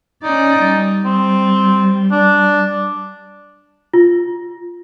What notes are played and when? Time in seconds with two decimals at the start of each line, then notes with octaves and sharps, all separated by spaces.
0.24 C#4 D#4 D5
0.65 G3
1.05 C4
2.11 D4
3.94 F4